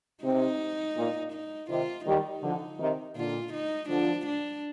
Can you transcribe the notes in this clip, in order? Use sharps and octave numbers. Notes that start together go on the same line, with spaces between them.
C3 D#4
A#2
D#4
C3 D#3 F4
D#3 G3 D#4
D3 F3
C3 D#3
A#2 D3 F4
D#4
D3 F3 D4
D4